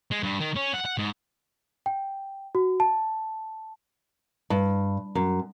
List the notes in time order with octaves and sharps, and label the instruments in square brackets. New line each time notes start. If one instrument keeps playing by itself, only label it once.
[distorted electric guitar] G#3
G2
D#3
C#4
F#5
F#5
G#2
[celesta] G5
F#4
A5
[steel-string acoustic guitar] G2
F#2